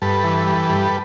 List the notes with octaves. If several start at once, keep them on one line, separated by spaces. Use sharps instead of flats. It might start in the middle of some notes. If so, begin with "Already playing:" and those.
G2 A4 B4
E3
G3
G2